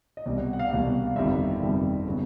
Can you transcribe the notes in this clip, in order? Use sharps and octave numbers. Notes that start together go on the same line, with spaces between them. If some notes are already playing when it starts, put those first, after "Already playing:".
D#5
C2 B2 G3 D5
F#5
F#5
F5
C2 B2 G3 F5
F5
G1 F2 C3 D#3 G3 E5
G1 F2 C3 D#3 G3
C#3 F#3 B3